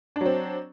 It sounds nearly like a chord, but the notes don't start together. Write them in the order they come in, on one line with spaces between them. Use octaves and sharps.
D4 F#3 C4